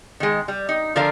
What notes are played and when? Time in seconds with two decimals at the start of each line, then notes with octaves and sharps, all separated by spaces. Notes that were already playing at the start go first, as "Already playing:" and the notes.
0.20 D#3 G#3
0.48 G3
0.69 D#4
0.96 D3 F3 F4 A#4 D5 F5